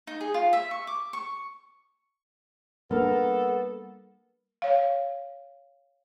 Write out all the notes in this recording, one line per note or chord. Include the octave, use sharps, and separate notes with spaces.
D#4
G#4
F4
E5
C#6
D6
C#6
G3 A#3 B3 D4 A4 A#4
C#5 F5